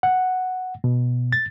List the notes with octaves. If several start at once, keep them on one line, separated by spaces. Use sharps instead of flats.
F#5
B2
A6